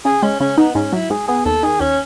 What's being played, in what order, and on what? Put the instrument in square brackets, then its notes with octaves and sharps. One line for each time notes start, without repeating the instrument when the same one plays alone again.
[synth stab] C#3 [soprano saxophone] G#4
[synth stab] G#3 [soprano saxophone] C#4
[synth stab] C#3 [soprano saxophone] C#4
[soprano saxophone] B3 [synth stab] D#4
[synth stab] G#2 [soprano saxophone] C#4
[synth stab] F#3 [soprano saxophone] E4
[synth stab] G#2 [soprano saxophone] G#4
[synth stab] B3 [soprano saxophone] G#4
[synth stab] D#2 [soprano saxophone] A4
[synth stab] D#3 [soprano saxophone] G#4
[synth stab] D#2 [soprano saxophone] C#4